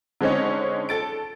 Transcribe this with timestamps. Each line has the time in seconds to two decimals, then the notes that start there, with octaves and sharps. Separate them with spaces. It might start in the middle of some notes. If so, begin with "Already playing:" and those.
0.21 D3 G#3 C4 C#4 D#4 C#5
0.89 A4 A6 D7